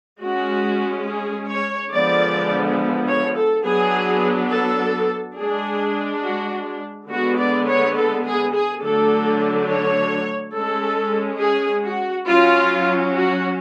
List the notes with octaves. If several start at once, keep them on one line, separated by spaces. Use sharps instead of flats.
G#3 C#4 F#4
G#4
C#5
D3 F3 G#3 B3 D4 D5
C#5
A4
F#3 B3 D4 G#4
A4
G#3 D4 G#4
F#4
D3 G#3 B3 F#4
D5
C#5
A4
G#4
G#4
D3 F#3 A3 D4 A4
C#5
G#3 C#4 A4
G#4
F#4
F#3 C#4 F4
F#4